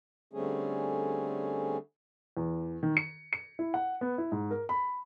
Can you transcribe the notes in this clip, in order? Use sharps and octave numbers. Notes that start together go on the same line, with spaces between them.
D3 G3 A3 C4 C#4 G#4
E2
D#3
C#7
C#7
E4
F#5
B3
E4
G#2
A#4
B5